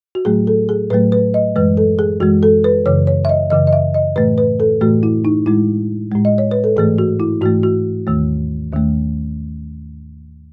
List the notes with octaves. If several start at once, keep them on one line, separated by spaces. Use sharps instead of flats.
F#4
A2 F#3 A3 G#4
A4
G#4
A2 F#3 A3 B4
B4
D#5
F#2 E3 G#3 B4
A4
G#4
F#2 E3 G#3 F#4
A4
B4
F#2 C#3 E3 C#5
C#5
E5
D#5
F#2 C#3 E3 D#5
D#5
E5
D#5
A2 E3 A3 B4
B4
A4
A2 E3 A3 F#4
E4
D#4
A2 G#3 E4
A2 G#3
D#5
C#5
B4
A4
G#2 E3 A3 G#4
F#4
E4
G#2 E3 A3 F#4
F#4
D#2 D#3 A3
D#2 D#3 A3